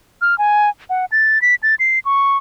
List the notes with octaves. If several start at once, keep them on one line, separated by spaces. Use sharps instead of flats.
F6
G#5
F#5
A6
B6
A6
C7
C#6